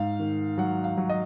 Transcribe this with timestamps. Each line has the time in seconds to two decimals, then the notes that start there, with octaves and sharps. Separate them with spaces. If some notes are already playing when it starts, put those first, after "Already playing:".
Already playing: G#2 F5
0.19 D#3
0.58 F#3 F#5
0.84 F5
0.98 F#3
1.09 D#5